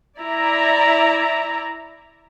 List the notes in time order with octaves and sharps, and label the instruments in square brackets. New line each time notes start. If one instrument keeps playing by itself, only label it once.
[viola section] E4 D5 E5 A#5